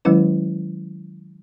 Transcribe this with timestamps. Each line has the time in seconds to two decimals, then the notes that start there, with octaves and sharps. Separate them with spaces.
0.05 D#3 F#3 G#3 C#4 E4 B4